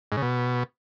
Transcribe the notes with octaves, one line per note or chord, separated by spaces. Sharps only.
G#2
C#3
B2